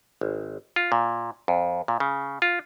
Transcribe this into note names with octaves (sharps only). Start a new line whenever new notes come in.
G#1
F4
A#2
F2
A#2
C#3
F4